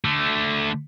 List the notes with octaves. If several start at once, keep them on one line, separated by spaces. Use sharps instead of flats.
D3 A3